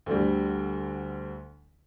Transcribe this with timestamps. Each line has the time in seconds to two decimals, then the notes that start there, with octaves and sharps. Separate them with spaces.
0.06 D2 D3 G3